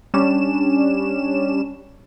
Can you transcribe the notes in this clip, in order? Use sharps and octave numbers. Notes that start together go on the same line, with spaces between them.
G3 C#4 D4 E7